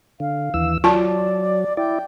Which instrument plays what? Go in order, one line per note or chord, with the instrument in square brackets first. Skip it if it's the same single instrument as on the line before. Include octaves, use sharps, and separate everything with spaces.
[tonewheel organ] D3 [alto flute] F5
[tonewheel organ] D#2 E3 E6
[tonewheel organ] F#3 [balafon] F4 A5 [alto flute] D5
[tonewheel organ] E4 D5 [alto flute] G5